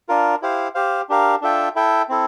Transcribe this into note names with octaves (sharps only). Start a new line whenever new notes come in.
D4 F4 A#4
E4 G4 C5 F5
G4 C5 F5
D4 G4 A#4 F5
D4 F4 A4 E5 G5
E4 A4 E5 G5
C4 E4 A4